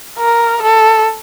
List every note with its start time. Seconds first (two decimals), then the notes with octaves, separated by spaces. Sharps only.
0.18 A#4
0.62 A4